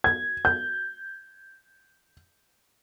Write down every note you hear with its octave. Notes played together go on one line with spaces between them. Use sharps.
G#6
G6